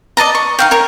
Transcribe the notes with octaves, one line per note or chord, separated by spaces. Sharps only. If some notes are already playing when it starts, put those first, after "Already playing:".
D5 D#5 A5 A#5
C#6
D#4 F5 G5
A#4 C#5 C#6